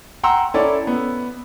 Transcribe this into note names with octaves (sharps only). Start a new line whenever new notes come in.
F#5 G5 A#5 C6 E6
C#4 E4 A4 D5
B3